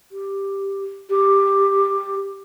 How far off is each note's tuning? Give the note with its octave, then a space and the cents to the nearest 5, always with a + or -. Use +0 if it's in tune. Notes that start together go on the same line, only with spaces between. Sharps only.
G4 +5
G4 +10